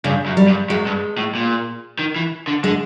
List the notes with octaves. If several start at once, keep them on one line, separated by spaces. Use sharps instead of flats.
G2 C#3
F#2
G3
G2
F#2 G#3
G2
A2
A#2
D#3
E3
D3
D3 G#3